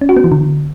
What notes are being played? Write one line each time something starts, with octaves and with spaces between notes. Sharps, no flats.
C#4
F#4
B3
E3
D3